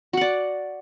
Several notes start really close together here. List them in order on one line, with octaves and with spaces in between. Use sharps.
F#4 F#5 D5